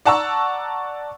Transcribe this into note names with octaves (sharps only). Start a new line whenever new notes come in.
D5 F#5 A5 A#5 C#6 E6